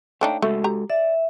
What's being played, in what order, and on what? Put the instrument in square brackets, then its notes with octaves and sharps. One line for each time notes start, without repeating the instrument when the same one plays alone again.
[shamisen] A3 D4 D#4 [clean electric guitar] C#5 F5 G5
[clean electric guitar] G#3 F#4 A4 [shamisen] A3
[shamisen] G4 A#5
[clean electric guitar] D5 [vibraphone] E5